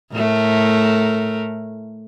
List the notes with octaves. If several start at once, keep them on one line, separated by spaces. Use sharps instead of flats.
A2 A3 A#4